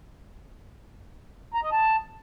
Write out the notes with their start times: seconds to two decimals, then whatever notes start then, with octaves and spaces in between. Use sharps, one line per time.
1.54 A#5
1.63 D#5
1.72 A5